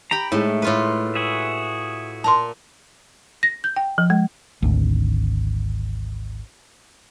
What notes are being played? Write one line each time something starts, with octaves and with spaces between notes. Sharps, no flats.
G4 G5 A#5 B5
A2 G#3 A3 D#4 E4
A2 F4 B4
F#4 G#4 E5
A#2 A5 A#5 C6
A#6
G6
G5
F3
G#3
G#1 D2